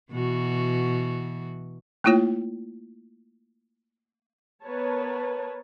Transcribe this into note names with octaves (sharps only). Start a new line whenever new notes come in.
B2 E3 F#4
A3 A#3 E4 F4 C#5 G5
B3 A#4 B4 C#5 A5